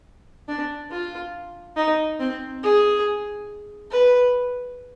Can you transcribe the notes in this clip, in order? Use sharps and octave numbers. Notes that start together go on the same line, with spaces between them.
D4
F4
D#4
C4
G#4
B4